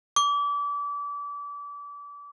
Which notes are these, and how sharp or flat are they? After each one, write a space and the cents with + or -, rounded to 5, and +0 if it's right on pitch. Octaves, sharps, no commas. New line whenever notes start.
D6 -30